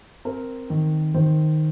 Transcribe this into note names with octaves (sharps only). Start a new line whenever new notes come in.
C4 A#4
D#3
D#3 C5